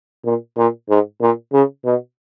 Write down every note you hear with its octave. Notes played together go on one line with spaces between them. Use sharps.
A#2
A#2
G#2
A#2
C#3
B2